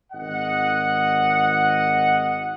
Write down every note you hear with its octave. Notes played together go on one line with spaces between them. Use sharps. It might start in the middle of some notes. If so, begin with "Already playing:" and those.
G#1 D#5 F#5